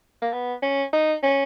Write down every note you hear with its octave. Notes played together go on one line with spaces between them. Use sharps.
A#3
B3
C#4
D#4
C#4